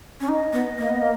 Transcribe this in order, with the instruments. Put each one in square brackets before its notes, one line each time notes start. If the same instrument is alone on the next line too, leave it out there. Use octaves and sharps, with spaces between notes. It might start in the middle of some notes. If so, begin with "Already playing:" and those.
[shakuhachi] C#4
[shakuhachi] D#4 [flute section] D#5
[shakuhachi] B3
A#3
B3
A#3